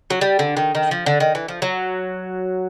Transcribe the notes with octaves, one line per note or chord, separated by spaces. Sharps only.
F#3
G3
D3
D#3
D#3
F3
D3
D#3
E3
F3
F#3